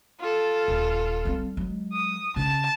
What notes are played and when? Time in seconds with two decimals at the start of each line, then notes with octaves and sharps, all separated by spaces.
0.20 F4 A4
0.68 D#1
1.25 G3 C4
1.57 F#3 G#3
1.92 D#6
2.36 C#3 C#4 A5